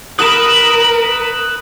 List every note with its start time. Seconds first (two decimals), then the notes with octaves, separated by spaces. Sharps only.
0.19 A#4 B4 B5 D#6 E7